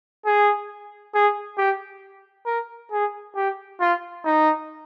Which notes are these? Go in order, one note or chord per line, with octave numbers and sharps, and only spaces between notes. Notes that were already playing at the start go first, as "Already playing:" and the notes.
G#4
G#4
G4
A#4
G#4
G4
F4
D#4